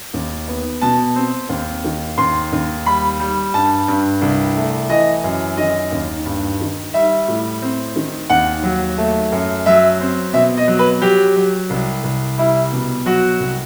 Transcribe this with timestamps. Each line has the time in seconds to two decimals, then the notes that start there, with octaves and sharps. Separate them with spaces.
0.14 D#2
0.48 B3
0.82 B2 A5
1.16 C4
1.49 D#2
1.84 D#3
2.18 D#2 C6
2.52 D#2
2.86 G3 B5
3.20 G3
3.54 G2 A5
3.88 G2
4.22 C2
4.56 A3
4.89 E3 D#5
5.24 F#2
5.57 D#3 D#5
5.92 D#2
6.25 G2
6.61 D#3
6.94 G3 E5
7.28 A2
7.62 C4
7.96 D#3
8.30 D#2 F#5
8.64 F#3
8.98 A3
9.32 F#2
9.66 F#3 E5
10.01 C4
10.34 B2 E5
10.57 D#5
10.68 F#3
10.79 B4
11.02 F#3 G4
11.36 F#3
11.70 C2
12.04 C2
12.38 G3 E4
12.73 B2
13.06 F#3 F#4
13.40 C2